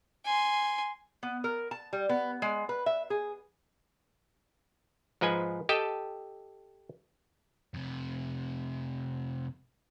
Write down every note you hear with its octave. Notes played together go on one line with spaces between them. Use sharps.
G#5 C6
B3
A#4
A5
G3
B3
G#3
B4
E5
G#4
G#2 F3 D#4 B4 G#5
G4 A4 D#5 G5 A5
F2 C3